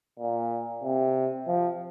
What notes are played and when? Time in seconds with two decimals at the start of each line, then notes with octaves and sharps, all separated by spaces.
0.19 A#2
0.84 C3
1.47 F3